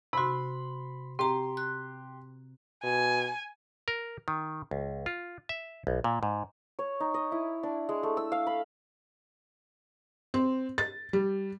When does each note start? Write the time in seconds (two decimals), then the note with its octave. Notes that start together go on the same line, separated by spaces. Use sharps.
0.13 C3 F#4 B5 C6
1.19 C4 G4 A#5 C6
1.57 F#6
2.83 B2 G#5
3.88 A#4
4.28 D#3
4.71 C#2
5.06 F4
5.49 E5
5.87 B1
6.04 A#2
6.23 G#2
6.79 C#5
7.00 D#4
7.14 D#5
7.32 E4
7.63 D4
7.89 G#3
8.03 A3
8.17 E6
8.32 F5
8.47 B5
10.34 C4
10.78 A6
11.13 G3